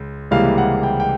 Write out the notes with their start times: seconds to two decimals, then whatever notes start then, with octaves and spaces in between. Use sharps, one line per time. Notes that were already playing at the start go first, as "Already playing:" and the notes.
Already playing: C#2
0.31 C#2 C3 E3 G3 A#3 F5
0.58 F#5
0.83 G5
1.00 G5